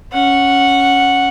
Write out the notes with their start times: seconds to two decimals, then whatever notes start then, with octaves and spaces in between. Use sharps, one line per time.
0.13 C#4 F#5